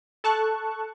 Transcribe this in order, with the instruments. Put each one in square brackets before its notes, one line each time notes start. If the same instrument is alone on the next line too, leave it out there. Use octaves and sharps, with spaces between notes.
[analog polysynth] A4 A5 C#6 F#6